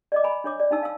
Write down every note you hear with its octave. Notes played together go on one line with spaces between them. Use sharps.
D5 D#5 D6
G#5 A#5 B5
D4 C#5 D6
D5
D4 D#4 A5 E6
F5 E6